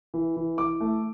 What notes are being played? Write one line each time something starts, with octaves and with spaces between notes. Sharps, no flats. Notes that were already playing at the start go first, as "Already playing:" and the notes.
E3
E3
E3 D6
A3